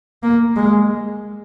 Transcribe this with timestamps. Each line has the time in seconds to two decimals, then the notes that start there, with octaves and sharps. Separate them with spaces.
0.23 A#3
0.56 G#3